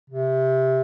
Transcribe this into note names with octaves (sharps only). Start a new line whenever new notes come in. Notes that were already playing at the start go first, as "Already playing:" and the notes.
C3